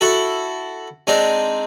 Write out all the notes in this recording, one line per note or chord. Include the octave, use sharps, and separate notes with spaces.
E4 F#4 A4
G#3 C4 D4 D#4